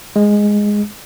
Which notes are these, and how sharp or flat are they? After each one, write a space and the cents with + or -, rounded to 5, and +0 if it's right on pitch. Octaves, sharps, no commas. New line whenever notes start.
G#3 -5